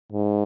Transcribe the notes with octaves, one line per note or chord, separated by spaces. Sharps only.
G#2